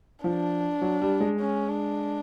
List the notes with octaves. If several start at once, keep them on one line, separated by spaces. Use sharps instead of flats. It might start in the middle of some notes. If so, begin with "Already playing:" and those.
F3 D4
F#3
G3
G#3
C#4
D4